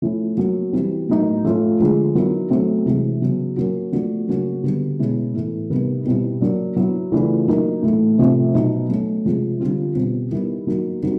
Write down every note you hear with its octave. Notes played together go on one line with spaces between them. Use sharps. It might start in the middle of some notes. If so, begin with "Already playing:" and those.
F3 A3 C#4 E4
F#3 A#3 C#4 F#4
E3 G3 C4
A2 F#3 A#3 D#4
F3 A3 C#4 F4
D3 F3 G#3
D#3 F#3 B3 E4
F#3 A3 C4
C3 E3 G#3
C#3 F#3 B3
F#3 A#3 C#4 F#4
F3 A3 D4 F#4
C#3 F#3 A#3 C#4 F#4
D3 G3 B3
B2 G#3 C#4 E4
A2 E3 A3
C3 D#3 G3 B3
B2 G3 C4 E4
F#3 A#3 D4
F#3 B3 E4
C#3 E3 A3 D4 F4
F#3 A#3 D#4
A2 E3 A3
C3 F3 A3 C4
B2 F#3 B3 D#4
F#3 A3 C#4
C3 F3 G#3
D3 G3 C4 F4
B2 G3 C4
D#3 G3 B3 E4
F#3 A#3 D#4 F#4
D#3 G3 C4 D#4 F#4